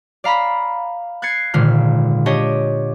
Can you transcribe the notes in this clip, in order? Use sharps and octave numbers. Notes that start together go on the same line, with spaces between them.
D5 F5 A#5 B5 B6
F#6 G#6 A6 C7 C#7
G#1 A#2 D3 F6
D4 G4 C#5 D#5